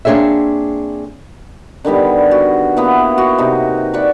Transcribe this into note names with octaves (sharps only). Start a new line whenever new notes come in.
A#3 C4 D4 G#4 C#5 E5
D3 D#3 G3 B3
F#4
A#3 B3 E4
F#4
C3 D#4
D5 F#5 B5 C#6